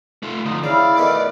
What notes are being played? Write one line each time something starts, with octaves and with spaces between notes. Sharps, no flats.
A3 F4
D3 F3 D#4
C#3 E4 D5 F5
B2 D#3 A3 B4